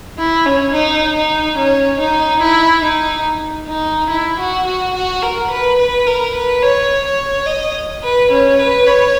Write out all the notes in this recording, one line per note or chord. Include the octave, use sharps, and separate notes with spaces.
E4
C#4
D#4
D#4
C#4
D#4
E4
D#4
D#4
E4
F#4
F#4
F#4
A#4
B4
B4
A#4
B4
C#5
C#5
D#5
B4
C#4
B4
C#5